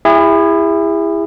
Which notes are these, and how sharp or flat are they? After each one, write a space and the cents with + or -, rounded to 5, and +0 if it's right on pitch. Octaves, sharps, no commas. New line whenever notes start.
E4 +10 G#4 -40